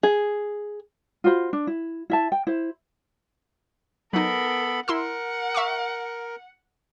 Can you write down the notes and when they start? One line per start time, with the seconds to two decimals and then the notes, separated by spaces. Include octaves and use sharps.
0.03 G#4
1.24 F4 F#4 C5 B5
1.53 D4
1.67 E4
2.10 E4 E5 A5
2.32 G5
2.47 E4 C5
4.13 F#3 B3 D#4 A4 A#4 B5
4.88 E4 A#4 F#5 C6 E6
5.54 E5 C#6 D6